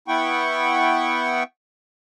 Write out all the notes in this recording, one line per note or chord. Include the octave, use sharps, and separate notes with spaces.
B3 E4 F#5 G5 C#6